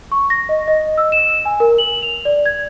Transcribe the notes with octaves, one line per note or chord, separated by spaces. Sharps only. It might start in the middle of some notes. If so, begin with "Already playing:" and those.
C#6
A#6
D#5
D#5
E6
E7
G#5
A#4
F#7
F7
D5
G#6